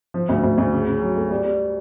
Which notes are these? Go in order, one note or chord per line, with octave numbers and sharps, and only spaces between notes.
F3
D2
D2
D2
C#3
C#3
F#3
A3
G3
G3